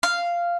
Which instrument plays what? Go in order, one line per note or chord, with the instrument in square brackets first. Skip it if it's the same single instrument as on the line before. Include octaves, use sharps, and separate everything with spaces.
[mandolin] F5